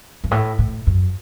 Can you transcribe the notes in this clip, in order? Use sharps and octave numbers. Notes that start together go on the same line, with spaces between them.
G2
A2
A2
F#2